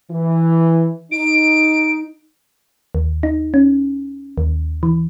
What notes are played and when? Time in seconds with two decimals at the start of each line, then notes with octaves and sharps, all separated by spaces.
0.11 E3
1.12 D#4 D7
2.95 D#2
3.23 D#4
3.54 C#4
4.38 D#2
4.83 E3